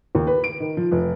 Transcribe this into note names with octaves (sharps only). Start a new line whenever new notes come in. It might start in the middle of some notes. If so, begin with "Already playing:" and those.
D#2
B4
D7
D#3
F3
F1